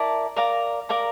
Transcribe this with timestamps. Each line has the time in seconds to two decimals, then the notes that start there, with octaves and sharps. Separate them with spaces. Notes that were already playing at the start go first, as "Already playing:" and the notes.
Already playing: E4 A#4 D5 A5
0.36 A#4 D5 F5 A#5
0.89 A#4 D5 F5 A#5